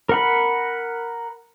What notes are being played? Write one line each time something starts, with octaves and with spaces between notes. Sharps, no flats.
A#4 F#5 B5